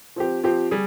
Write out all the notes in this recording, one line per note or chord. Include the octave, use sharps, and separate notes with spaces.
F3 C4 G4
F3 C4 G4
G3 G#4